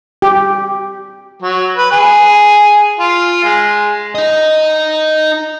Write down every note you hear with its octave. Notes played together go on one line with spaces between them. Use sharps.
G4
F#3
B4
G#4
F4
G#3
D#4 D#5